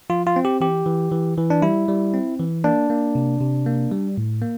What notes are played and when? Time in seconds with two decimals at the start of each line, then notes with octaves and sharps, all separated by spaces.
0.10 F3 F4
0.27 F4
0.36 C4
0.45 G4
0.60 E3 G4
0.86 E3
1.11 E3
1.38 E3
1.50 D4
1.62 G3 E4
1.88 G3
2.14 C4
2.40 E3
2.64 A#3 D4
2.90 A#3
3.15 C3
3.41 C3
3.66 A#3
3.92 G3
4.18 A2
4.42 A#3